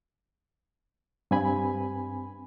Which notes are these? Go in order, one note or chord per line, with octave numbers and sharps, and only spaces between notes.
G2 C4 G#5 B5